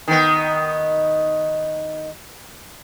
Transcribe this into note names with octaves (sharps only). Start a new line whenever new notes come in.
D#3 B3